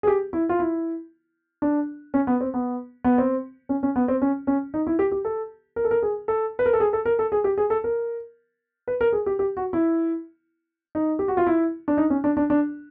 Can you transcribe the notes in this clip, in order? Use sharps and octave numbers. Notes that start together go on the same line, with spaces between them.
G#4
G4
E4
F4
E4
D4
C#4
B3
C4
B3
B3
C4
C#4
C#4
B3
C4
C#4
C#4
D#4
E4
G4
G4
A4
A#4
A4
A#4
G#4
A4
B4
A#4
A4
G#4
A4
A#4
A4
G#4
G4
G#4
A4
A#4
B4
A#4
G#4
G4
G4
F#4
E4
D#4
G4
F#4
F4
E4
D4
D#4
C#4
D4
D4
D4